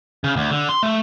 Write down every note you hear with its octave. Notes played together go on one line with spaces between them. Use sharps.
C#3
D2
D3
C6
A3